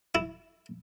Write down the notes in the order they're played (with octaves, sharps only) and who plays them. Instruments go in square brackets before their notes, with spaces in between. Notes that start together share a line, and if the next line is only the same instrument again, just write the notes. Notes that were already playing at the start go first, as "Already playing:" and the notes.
[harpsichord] E4